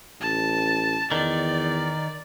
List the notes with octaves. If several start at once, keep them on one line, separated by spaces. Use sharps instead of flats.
A1 A5
E2 D#3 D5